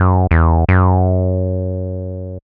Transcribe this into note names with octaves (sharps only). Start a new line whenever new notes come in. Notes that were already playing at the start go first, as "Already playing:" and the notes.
Already playing: F#2
E2
F#2